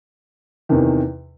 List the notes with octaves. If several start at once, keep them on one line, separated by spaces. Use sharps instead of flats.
E2 C3 D#3